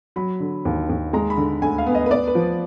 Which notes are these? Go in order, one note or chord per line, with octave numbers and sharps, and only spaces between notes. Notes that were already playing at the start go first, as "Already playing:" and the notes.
F#3 B5
D3
D#2
D#2
G#3 A#5
B5
D3
D2 G#5
F5
B3
D#5
B4
B3 D5
B4
F3